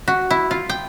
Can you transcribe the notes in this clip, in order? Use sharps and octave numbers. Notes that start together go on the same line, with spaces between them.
F#4
E4
F4
G5